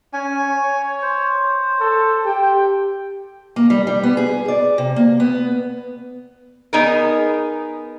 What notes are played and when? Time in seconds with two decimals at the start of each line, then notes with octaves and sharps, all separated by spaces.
0.13 C#4 G#5
0.49 C#5
1.02 C5
1.80 A4
2.25 G4 G5
3.56 A#3
3.70 G3
3.87 G3
4.03 B3
4.17 G#4
4.48 D5
4.78 C3
4.96 A#3
5.20 B3
6.73 B3 D#4 G#4 A#4